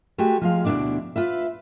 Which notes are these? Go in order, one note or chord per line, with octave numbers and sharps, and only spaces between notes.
G#3 A3 F#4 G4
F3 G#3 F5
D2 B2 G#3 D4 E4 D5
F4 B4 E5